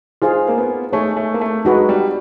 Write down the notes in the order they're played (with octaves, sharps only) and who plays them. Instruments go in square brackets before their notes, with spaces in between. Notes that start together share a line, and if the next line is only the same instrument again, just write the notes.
[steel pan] D#4 G#4 C5 F5 [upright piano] F4
[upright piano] A#3
B3
[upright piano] A3 [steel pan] D#4 G#4 C#5
[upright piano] A3
A#3
A3
[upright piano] G#3 [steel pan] D#4 F#4 B4
[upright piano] G3